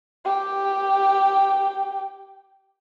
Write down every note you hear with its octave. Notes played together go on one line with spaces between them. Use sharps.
G4 G5